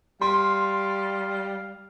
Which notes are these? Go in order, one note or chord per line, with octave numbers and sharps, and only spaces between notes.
G3 F5 C6